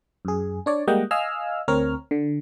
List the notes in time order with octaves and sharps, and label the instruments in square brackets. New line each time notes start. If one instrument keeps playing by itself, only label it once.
[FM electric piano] F#2 G#4
D4 C#5 D5
G3 G#3 A#3 D#5 F#5 G5
D#5 F5 G#5 E6 F6
D2 C4 A#4 C#5 F6
D3